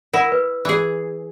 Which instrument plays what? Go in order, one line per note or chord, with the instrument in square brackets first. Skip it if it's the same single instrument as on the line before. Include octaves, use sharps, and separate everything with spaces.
[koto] E4 [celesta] A#4 F#5 A#6
[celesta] B4
[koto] E3 G#4